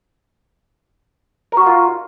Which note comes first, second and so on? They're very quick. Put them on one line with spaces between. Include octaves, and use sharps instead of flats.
A#4 F#4 A#5 F4